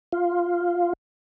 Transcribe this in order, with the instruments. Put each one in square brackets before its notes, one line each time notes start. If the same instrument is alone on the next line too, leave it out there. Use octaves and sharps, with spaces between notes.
[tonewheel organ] F4